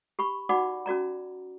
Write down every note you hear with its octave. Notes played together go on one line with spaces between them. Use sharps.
G4 B5 C#6
D#4 F#4 D5 F#5 B5 D6
C#4 F#4 D5 A#5